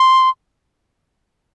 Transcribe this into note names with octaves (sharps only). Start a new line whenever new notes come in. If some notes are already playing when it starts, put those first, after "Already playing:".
Already playing: C6